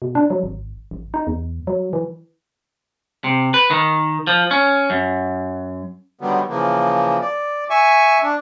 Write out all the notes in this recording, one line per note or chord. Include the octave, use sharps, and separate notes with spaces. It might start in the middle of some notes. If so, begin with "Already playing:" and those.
B2
D4
F#3
G#1
A1
D#4
E2
F#3
E3
C3
B4
D#3
F3
C#4
F#2
D3 D#3 F#3 G3 B3
C#3 E3 F3 A#3
D5
E5 G#5 C#6
D4